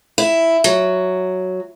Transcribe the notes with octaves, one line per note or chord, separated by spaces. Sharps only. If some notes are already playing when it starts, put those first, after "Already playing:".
E4
F#3